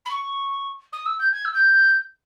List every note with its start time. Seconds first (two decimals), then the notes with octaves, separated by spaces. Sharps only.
0.05 B5
0.11 C#6
0.92 D#6
1.05 E6
1.19 G6
1.33 G#6
1.45 E6
1.54 G6